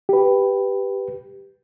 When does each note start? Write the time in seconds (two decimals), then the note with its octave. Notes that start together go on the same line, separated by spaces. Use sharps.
0.09 G4 B4